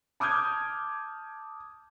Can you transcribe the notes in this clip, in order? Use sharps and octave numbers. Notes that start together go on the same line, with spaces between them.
A5 D6 D#6 F6 G6 G#6